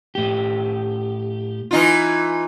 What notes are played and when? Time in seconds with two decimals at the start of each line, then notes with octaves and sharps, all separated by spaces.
0.15 A2 G4
1.71 E3 D#4 F4